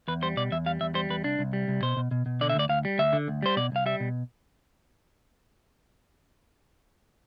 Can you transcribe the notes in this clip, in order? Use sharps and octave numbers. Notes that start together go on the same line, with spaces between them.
E2 B4
G3 C5
B2 D5
E2 E5
G3 F5
E2 E5
G3 C5
E2 B4
C2 D4
C2
G3
C2
B2 C5
B2
B2
B2
D3 D5
E5
D2 D5
D2 F5
G3
D2 E5
D3
D2
G3 C5
B2 D5
C2 F5
G3 E5
B2